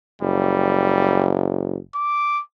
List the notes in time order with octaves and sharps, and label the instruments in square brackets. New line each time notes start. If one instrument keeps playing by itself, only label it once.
[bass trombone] F#1 [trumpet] G3
[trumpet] D6